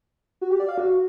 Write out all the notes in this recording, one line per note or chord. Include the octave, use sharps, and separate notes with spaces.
F#4
G4
D5
F5
F#4